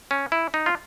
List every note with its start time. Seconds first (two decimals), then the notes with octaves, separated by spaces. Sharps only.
0.11 C#4
0.32 E4
0.54 D#4
0.66 F4